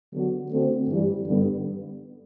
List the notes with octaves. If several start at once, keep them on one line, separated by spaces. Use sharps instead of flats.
D3 F#3 B3 F#4
D3 A3 C4 F#4
G2 E3 G3
G2 D3 G3 B3